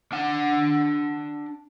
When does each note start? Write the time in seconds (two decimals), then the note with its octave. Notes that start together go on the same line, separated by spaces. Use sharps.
0.12 D4 F#5